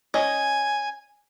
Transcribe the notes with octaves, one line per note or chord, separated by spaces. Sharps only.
C#4 D#5 G#5